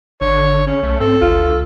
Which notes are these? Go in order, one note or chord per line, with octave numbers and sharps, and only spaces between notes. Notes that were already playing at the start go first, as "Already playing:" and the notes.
G#1 D3 C#5
C#3 C#4
B1 A3
G#2 C4 A4
G#1 D2 F4
C#2